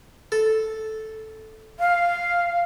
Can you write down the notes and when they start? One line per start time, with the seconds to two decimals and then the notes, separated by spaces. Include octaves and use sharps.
0.32 A4
1.79 F5